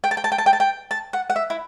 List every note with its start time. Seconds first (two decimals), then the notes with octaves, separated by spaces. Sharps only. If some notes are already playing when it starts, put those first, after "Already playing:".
0.04 G5
0.11 A5
0.17 G5
0.24 A5
0.32 G5
0.38 A5
0.46 G5
0.53 A5
0.60 G5
0.91 A5
1.13 F#5
1.30 F#5
1.36 E5
1.50 E4